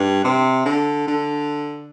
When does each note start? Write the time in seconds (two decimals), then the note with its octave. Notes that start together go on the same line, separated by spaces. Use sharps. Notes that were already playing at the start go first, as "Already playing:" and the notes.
Already playing: G2
0.24 C3
0.65 D3
1.08 D3